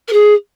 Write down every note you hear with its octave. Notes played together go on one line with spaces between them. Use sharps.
A#4
G#4